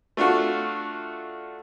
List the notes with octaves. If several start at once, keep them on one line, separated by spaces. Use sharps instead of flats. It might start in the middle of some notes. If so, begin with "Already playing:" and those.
A3 D4 F4 F#4